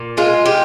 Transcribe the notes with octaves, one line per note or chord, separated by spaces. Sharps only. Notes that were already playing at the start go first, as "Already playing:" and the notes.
Already playing: A#2
G#3 F4
G#3 G4